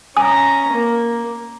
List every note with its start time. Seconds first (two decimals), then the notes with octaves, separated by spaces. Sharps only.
0.17 C#4 G#5 A#5 D#6
0.73 A#3